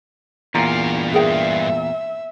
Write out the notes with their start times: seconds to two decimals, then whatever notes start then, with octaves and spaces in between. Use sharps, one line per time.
0.55 E2 G2 A#2 F5 A#5
1.14 G#4 A#4 E5 G5